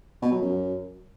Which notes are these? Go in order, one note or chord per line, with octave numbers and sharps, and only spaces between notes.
B2
F#3
F#2